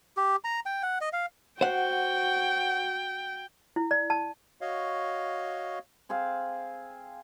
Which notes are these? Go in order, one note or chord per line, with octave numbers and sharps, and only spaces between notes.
G4
A#5
G5
F#5
D#5
F5
F#4 C5 F#5 G5
E4
D5
A5
F#4 C#5 D#5 F5
C4 G#4 C5 F5